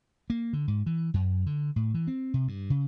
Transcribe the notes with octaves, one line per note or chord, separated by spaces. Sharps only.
A#3
D3
G#2
E3
F#2
D3
A2
E3
C4
C3
G2
C#3